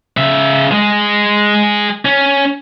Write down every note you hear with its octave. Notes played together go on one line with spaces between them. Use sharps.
C#3 E5
G#3 G#4
C#4